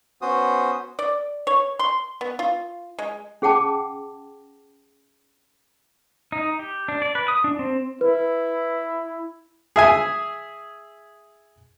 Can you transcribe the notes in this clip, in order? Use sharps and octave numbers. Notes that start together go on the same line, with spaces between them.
B3 C#4 F#4 C5 D#6
D5
C#5
C6
B3
F4
G#3
C#4 G#4 F#5 G5 A5 D6
D#4
G4
D4
D5
B4
D#6
D4
C4
E4 B4
G#4 E5 G#5